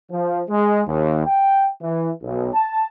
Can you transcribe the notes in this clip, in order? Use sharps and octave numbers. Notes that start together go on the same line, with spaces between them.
F3
G#3
D#2
G5
E3
B1
A5